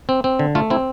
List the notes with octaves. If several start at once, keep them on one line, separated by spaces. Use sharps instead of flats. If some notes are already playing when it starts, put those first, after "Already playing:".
C4
C4
D3
A3 F4
C4 E4